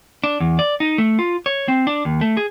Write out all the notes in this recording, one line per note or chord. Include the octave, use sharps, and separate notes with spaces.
D4
E2
D5
D#4
A3
F4
C#5
C4
D4
D#2
A3
G#4